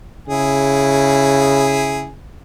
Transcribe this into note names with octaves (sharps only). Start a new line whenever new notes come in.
C#3 E4 G#4